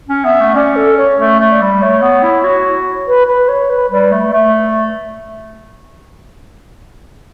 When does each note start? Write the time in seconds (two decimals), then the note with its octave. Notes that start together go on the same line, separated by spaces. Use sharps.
0.09 C#4
0.25 B3 E5
0.40 A3
0.56 C#4 D5
0.76 A4
0.97 C#5
1.19 A3
1.39 A3
1.51 D5
1.61 G3
1.81 A3 C#5
2.02 B3
2.23 E4
2.44 F#4
3.07 B4
3.27 B4
3.49 C#5
3.70 B4
3.91 G3 B4
4.11 A3
4.32 A3 E5